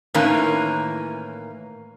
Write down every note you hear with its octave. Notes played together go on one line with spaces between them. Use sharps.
A2 D#3 E3 A#3 C#4